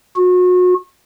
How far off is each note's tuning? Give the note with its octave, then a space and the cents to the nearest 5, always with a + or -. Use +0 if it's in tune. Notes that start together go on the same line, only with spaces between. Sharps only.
F#4 -35